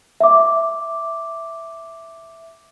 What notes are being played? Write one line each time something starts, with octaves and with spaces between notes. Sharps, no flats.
E5 D6